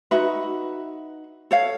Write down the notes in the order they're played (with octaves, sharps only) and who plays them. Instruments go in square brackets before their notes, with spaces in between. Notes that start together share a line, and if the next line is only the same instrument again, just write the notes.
[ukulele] D#4 F#4 B4 E5
A4 C#5 F5